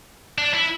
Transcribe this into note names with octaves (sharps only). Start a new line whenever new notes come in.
D4
E4